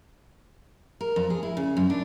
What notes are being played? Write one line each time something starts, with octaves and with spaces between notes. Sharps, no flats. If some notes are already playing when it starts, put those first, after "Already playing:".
A#4
F2
G#4
E4
C#3
F#2
D4